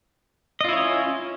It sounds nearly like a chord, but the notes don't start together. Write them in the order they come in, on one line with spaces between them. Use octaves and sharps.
D#5 F4 E4 C#5 C#4